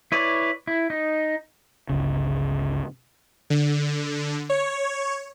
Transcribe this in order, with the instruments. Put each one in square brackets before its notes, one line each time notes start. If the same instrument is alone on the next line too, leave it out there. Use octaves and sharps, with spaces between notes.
[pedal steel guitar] E4 B4 C#5 D5
E4
D#4
[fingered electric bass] G1 C#2 C#3
[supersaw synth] D3
C#5